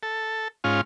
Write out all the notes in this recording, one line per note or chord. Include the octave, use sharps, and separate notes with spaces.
A4
G#2 C#4 F4